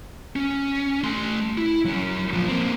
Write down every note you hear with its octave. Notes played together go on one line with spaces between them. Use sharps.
C#4
A3 C6
E4
F#3 C#4
A#2 F3
A#3 C4